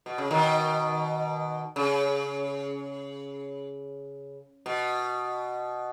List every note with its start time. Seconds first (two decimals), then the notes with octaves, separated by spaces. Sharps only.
0.06 B2
0.18 C#3
0.31 B2 D#3
1.76 C#3
4.66 B2